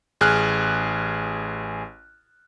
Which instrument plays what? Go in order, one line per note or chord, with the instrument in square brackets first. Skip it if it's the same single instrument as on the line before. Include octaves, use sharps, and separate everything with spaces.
[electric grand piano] A1 G#4 F6 F#6